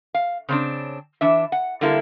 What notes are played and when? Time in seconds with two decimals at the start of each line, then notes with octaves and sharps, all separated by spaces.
0.14 F5
0.49 C#3 C4 D4
1.21 E3 D4 E5
1.52 F#5
1.81 D3 G3 A#3 E4 A4